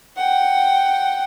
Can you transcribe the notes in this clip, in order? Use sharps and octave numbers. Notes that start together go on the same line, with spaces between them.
F#5 G5